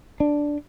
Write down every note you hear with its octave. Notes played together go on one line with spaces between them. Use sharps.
D4